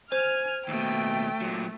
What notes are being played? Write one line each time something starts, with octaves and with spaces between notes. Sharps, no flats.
C5 G#5 F6
D#2 B2 A3 G5
A#2 F#3